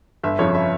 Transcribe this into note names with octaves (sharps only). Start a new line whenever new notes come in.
G1 E5
F2 C#3 F3 C#5
E5